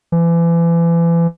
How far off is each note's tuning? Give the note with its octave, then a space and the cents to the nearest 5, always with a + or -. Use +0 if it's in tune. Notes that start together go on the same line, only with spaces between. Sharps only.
E3 +35